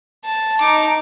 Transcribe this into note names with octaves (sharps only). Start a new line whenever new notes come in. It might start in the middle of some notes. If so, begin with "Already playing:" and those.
A5
D#4 D6